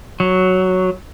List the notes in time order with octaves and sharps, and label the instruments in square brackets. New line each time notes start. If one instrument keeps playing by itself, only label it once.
[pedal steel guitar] F#3